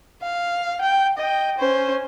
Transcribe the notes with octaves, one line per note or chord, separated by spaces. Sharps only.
F5
G5
D#5 G5
C#4 C5